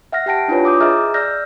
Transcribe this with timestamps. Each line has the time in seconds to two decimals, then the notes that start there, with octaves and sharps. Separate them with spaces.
0.12 E5 F#5 F6 A#6
0.26 G4 F#5 G5 A5 A#6 D7
0.48 D4 E4 F4 B4 C#5
0.65 D6 D#6 G6
0.81 G#4 D#5 E5 A#5 F6
1.14 D5 E6 F6 G6 A#6